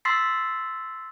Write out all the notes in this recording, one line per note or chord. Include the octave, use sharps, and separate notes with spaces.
C6 E6 A6 B6 C7